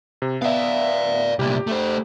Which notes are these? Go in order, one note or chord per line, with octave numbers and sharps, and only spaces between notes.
C3
B3 D5 E5 F5
C2 A#2 G4
A3 C5